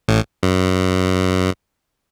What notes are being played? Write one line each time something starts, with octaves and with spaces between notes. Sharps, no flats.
A1 A2
F#2